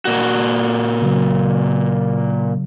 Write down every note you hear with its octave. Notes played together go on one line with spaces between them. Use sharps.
A#2 F#4
C#3 F#3